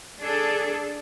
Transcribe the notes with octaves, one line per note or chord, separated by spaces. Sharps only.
D4 G#4 A4